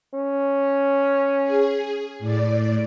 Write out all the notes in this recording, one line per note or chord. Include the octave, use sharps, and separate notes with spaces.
C#4
G#4
A2 D5